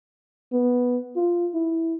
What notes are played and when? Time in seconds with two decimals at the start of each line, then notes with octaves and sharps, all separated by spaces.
0.52 B3
1.16 F4
1.54 E4